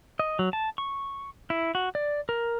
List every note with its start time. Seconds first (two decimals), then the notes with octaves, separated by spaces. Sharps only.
0.19 D#5
0.39 F#3
0.53 A5
0.78 C#6
1.50 E4
1.75 F#4
1.95 D5
2.29 A#4